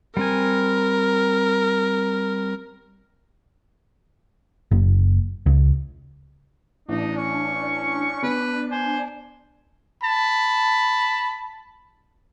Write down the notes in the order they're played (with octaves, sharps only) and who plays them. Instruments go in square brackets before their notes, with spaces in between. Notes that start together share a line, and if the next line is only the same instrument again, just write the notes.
[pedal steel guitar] G3 C4 G#5 [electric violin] A#4
[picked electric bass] F#1
C#2
[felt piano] A1 [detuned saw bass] D4 [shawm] D#4
[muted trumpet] C#4 [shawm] C#6
[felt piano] B3 [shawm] B4
[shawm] C5 [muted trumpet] G#5
[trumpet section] A5 B5